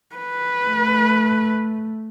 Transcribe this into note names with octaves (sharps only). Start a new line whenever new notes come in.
B4
A3